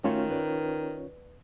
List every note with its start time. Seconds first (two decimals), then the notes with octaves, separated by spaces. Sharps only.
0.04 D#3 A3 C#4 F4 F#4 C#5
0.30 B4 D5